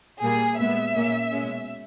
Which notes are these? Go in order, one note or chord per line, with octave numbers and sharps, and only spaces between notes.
A#2 G3 A#3 G#4
A#2 G#3 B3 E5
A#2 A#3 C#4
B2 G#3 C#4